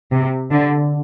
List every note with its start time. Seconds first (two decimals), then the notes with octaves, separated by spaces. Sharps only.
0.12 C3
0.51 D3